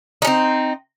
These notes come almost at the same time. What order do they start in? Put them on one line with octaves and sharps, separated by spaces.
D#4 C#4 C4